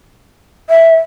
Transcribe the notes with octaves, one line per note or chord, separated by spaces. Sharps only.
E5